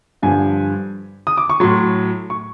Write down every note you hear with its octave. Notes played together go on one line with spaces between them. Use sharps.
G2 D3 F3 G#5
D#6
D6
C#6
A2 F#3 C6
C#6